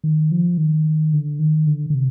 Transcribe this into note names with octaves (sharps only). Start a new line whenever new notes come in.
D#3
F3
D#3
D3
D#3
D3
D3
C3